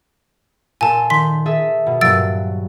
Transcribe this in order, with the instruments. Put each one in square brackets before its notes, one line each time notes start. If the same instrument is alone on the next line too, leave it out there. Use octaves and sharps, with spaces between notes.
[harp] A#2 A4 C6 [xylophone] G#5 A5
[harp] D#3 [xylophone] C6 B6
[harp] G#4 A4 E5
B2
[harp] G2 A#2 F#3 [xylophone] E6 A6 D7